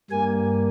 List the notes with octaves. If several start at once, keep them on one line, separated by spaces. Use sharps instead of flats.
G2 G3 A#3 G#5